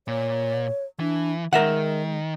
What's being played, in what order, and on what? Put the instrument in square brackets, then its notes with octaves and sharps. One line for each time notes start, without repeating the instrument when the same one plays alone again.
[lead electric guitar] A#2 [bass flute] C#5
[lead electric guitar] E3 [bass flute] D4
[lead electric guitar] D#3 [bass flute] G#3 [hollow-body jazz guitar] A#4 E5 F#5